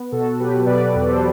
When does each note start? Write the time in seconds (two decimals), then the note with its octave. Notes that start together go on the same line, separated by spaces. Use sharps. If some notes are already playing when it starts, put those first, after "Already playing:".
Already playing: B3
0.12 B2 F#4 A4
0.40 F#3 G4 B4
0.66 B2 B4 D5
0.95 E2
1.08 A4 C5